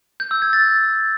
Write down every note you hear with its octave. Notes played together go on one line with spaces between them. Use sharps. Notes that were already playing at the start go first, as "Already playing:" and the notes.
G6
E6
G#6
A6